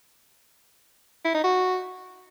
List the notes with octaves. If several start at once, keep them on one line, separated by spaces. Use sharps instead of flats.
E4
D#4
F#4